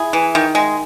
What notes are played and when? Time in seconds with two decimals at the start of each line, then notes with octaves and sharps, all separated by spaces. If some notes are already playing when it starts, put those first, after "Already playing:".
Already playing: E4 G#4
0.13 E3
0.35 D#3
0.55 G#3